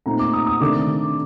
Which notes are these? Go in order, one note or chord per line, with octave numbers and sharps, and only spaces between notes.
A#2 A3 C4 D#4 A#5
D6
D#6
D#6
C3 D#3 A3 D4 D6